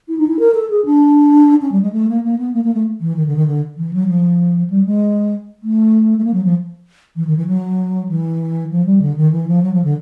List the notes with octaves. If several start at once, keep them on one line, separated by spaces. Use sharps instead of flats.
E4
D#4
E4
A#4
A4
G#4
D4
C#4
G3
G#3
A3
A#3
A#3
B3
A#3
A#3
A3
E3
D#3
D3
D#3
D3
E3
F#3
F3
G3
G#3
A3
A3
A#3
F#3
F3
E3
D#3
E3
F#3
E3
F3
G3
D3
D#3
E3
F3
F#3
F3
D3